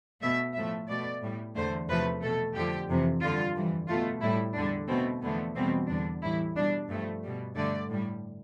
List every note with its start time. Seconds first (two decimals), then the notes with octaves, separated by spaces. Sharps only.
0.22 B2 A3 E5
0.54 A2 F3 A3 E5
0.88 B2 A3 D5
1.22 A2 G3
1.55 E2 D3 A3 C5
1.88 E2 C3 F3 A3 B4
2.22 B2 A3 A4
2.55 F2 D3 F3 G4
2.89 F2 C3 E3
3.22 G2 D3 G3 F4
3.55 F2 E3 G3
3.88 B2 A3 F4
4.22 A2 G3 E4
4.55 E2 D3 G3 D4
4.88 B2 A3 C4
5.22 E2 D3 F3 A3 B3
5.55 E2 B2 G3 C4
5.88 E2 D3 G3 D4
6.22 A2 E3 G3 E4
6.56 B2 G3 D4
6.88 G2 F3 A3
7.23 B2 G3
7.55 G2 D3 A3 D5
7.89 A2 G3